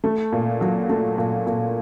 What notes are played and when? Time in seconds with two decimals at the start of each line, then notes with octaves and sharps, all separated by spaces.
0.04 A3
0.32 A#2
0.61 F#3
0.89 A3
1.18 A#2
1.47 A#2